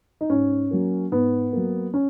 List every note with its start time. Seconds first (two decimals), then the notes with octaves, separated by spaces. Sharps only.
0.21 D#4
0.30 G#2 C#4
0.71 F#3 A#3
1.11 G#2 B3
1.53 F#3 A#3
1.94 C#4